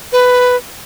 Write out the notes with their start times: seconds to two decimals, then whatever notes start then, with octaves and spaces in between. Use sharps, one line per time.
0.12 B4